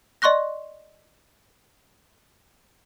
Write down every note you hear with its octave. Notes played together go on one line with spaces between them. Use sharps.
D5 D#5 C6 C#6 F#6 A#6